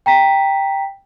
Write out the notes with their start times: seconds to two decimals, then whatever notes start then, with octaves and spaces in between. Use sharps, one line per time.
0.06 G5 A#5 B6